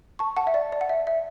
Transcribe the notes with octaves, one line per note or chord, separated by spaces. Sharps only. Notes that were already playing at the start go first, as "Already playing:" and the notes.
A5 C#6
F#5 A5
E5
D5
D5
F#5
E5
E5